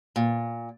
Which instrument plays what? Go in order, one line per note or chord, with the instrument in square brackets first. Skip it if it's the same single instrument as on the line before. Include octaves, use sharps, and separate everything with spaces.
[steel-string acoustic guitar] A#2